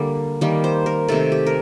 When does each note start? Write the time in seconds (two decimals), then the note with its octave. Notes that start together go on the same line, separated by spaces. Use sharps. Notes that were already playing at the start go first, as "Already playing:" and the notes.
Already playing: D3 G3 A#3
0.41 D#3 G3 A#3
0.64 C5
0.86 A#4
1.08 C3 D#3 A3 A4
1.32 G4
1.47 A#4